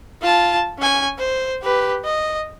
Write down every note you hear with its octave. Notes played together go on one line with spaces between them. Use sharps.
F4 A5
C#4 G#5
C5
G4 B4
D#5